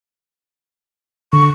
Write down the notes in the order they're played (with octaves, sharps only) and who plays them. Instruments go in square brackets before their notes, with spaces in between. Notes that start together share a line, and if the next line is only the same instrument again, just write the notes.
[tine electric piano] D3 [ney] C#6